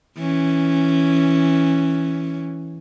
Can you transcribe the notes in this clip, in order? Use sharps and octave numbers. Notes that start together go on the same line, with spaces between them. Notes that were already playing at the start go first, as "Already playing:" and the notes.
E3 C#4